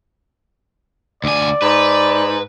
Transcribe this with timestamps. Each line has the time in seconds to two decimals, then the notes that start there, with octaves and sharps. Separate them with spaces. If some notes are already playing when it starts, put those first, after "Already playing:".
1.24 D2 D5 G#5
1.62 G#2 B4